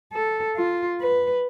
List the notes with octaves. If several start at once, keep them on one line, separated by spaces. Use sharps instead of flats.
A4
F4
B4